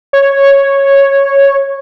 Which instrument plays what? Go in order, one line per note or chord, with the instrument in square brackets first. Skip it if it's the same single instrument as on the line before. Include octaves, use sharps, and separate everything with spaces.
[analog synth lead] C#5